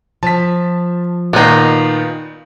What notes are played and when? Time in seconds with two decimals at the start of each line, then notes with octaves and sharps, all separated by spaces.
0.23 F3 A5 B6
1.33 A#2 D#3 B3 D#4 F4